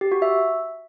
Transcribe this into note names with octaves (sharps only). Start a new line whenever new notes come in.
G4
F#4
E5